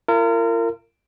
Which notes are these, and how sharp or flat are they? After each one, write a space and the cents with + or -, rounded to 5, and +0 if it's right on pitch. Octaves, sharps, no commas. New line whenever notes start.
F4 -45 A#4 -30